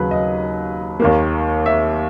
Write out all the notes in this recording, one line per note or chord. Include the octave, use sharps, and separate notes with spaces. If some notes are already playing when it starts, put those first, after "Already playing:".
Already playing: D#2 C#3 F#3 B4
D#5
D#2 D#3 A#3
E5